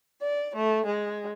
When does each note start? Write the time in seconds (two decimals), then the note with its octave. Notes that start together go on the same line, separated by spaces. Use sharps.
0.21 D5
0.56 A3
0.85 G#3